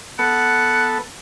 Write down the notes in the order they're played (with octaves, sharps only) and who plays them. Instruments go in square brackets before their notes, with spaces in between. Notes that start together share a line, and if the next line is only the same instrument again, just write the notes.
[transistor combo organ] B3 A4 [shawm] F#5